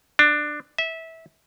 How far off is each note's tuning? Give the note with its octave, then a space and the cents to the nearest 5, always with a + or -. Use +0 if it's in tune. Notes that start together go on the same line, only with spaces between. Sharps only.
D4 +15
E5 -20